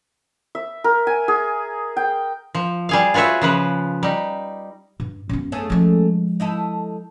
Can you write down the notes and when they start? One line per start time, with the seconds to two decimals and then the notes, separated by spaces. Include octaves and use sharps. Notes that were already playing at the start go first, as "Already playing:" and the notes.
0.55 E5
0.84 A#4
1.07 G#5
1.28 G#4
1.97 G5
2.55 F3
2.89 G3 G#4 F5
3.14 F4 F#4 B4 C#5 E5
3.41 C#3 F3 B4
4.03 G3 D#4
5.00 G2
5.29 F#2 B3
5.52 A3 C#4 G#4
5.70 F3 G#3
6.40 D#4 E4 A4